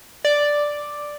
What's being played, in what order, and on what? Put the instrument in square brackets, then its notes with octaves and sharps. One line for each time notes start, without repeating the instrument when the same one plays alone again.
[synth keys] D5